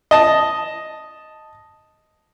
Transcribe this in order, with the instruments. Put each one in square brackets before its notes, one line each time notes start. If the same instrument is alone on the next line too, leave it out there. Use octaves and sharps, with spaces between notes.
[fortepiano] D#5 A5